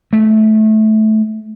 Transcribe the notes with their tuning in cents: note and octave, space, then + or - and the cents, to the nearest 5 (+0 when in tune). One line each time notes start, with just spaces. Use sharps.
A3 -20